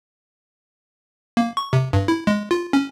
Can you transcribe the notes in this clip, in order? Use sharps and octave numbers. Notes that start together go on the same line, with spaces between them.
A#3
C#6
C3
G2
E4
G#3
F4
C#4